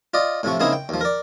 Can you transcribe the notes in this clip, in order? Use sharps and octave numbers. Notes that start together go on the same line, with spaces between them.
F4 D5 D#5
A2 C3 F3 C#6
C#3 A#3 C4 D#4 E4 G#4
G5
D#2 F3
A#4 D5